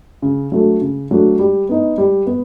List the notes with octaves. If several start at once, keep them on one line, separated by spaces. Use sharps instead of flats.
C#3
F#3 A3 D4
C#3
F#3 A3 D4
G3
B3 D#4
G3
B3